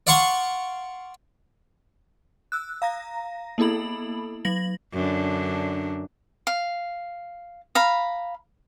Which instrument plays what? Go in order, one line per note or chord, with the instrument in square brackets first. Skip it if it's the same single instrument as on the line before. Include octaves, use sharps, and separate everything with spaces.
[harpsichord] D5 F5 F#5 C6 C#6
[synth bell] E6 F#6
F5 A#5 A#6
A#3 B3 E4 A4 B5 F#7
F#3 A#6 F#7
[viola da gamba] F#2 D3 D4
[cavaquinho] F5
F5 A#5 B5